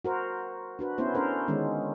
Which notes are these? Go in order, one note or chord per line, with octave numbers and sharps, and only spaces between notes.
F#4 A#4 C5
D4 F#4 B4
B3 C#4 E4 B4 C5
C#4 D4 A4 A#4 C5
D3 D#3 G#3 B3 C#4